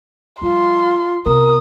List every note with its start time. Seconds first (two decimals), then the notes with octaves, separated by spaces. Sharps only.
0.42 F3 G3 F4 C6
1.26 C3 B3 A#4 D#6